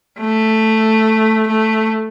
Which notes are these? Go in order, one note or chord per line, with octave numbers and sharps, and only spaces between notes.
A3
A3